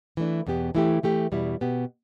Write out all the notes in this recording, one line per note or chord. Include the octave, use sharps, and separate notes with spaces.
E3 A3 D4
E2 B2 B3 G4
E3 A3 E4 G4
E3 A3 G4
E2 B2 G3 E4
B2 B3 G4